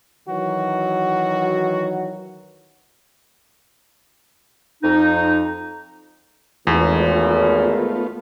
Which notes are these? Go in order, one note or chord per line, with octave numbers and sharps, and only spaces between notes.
D#3 E3 F#3 F#4
F2 D#4
G#1 E2 A3 B3 F4